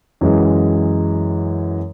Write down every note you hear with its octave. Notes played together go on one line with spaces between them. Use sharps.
F#2 E3 G#3